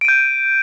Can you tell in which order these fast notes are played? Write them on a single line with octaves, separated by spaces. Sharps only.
D7 D#7 G6